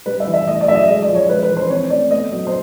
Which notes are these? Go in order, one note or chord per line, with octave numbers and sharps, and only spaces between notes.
G3 B4
E5
E3
E5
A3 D#5
D5
F#3 E5
D#5
G#3 D#5
D5
F3
C#5
G#3 B4
B4
E3
C5
C4 C#5
A3 D5
B3 D#5
F#3 D#5
C5